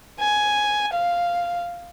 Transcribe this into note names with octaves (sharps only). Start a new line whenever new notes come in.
G#5
F5